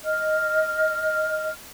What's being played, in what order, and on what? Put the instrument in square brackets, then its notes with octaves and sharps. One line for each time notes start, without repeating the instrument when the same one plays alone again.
[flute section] D#5 F6